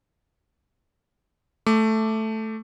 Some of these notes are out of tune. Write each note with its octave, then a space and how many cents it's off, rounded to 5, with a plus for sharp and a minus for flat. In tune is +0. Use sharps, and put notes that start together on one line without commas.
A3 +0 D6 +0